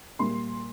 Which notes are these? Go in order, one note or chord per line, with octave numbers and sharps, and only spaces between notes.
A#2 G3 A#3 C6